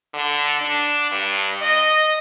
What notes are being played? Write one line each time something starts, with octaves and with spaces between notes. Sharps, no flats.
D3
D4
G2
D#5